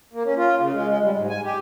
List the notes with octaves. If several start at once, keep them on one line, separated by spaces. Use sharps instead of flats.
A#3
C#4
F4
C#3
G#3
G#3
G3
G#2
G#5
G4